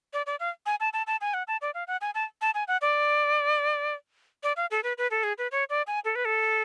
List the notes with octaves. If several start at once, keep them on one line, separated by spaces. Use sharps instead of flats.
D5
D5
F5
G#5
A5
A5
A5
G#5
F#5
A5
D5
F5
F#5
G#5
A5
A5
G#5
F#5
D5
D5
F5
A4
B4
B4
A4
G#4
B4
C#5
D5
G#5
A4
B4
A4